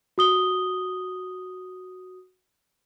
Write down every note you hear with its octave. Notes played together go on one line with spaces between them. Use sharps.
F#4 D#6 G7